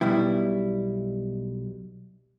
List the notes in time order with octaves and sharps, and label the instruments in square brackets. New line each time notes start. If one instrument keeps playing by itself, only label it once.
[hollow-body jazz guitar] B1 B2 G3 E4